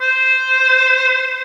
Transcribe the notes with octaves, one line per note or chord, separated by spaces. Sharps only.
C5